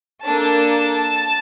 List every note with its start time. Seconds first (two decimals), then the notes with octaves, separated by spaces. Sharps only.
0.23 A#3 D4 A4 A5